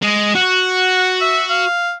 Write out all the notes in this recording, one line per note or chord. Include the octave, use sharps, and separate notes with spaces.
G#3 D#5
F#4 F#5
E5
F5